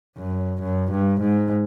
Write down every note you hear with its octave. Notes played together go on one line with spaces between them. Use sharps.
F#2
F#2
G2
G#2